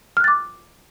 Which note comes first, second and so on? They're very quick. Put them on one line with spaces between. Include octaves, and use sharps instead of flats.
F6 F#6 A6 D6